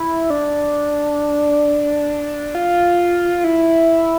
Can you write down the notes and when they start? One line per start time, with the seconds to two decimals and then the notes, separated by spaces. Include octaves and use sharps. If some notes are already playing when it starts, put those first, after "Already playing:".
Already playing: E4
0.30 D4
2.55 F4
3.44 E4